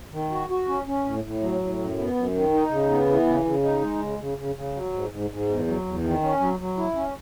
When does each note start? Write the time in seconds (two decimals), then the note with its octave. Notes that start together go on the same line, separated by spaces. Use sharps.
0.12 D#3
0.31 F#4
0.50 F#4
0.68 C#4
0.86 C#4
1.05 A2
1.24 A2
1.41 F#3
1.61 A2
1.79 F#2
1.98 B3
2.15 F#2
2.34 D#3
2.53 D#4
2.71 C#3
2.90 B3
3.09 E3
3.26 C#3
3.45 C#3
3.63 D#4
3.81 G#3
4.01 C#3
4.19 C#3
4.38 C#3
4.56 C#3
4.75 F#3
4.93 G#2
5.11 G#2
5.30 G#2
5.48 E2
5.67 F#3
5.86 E2
6.04 D#3
6.22 C#4
6.40 F#3
6.60 F#3
6.77 E4
6.96 C#4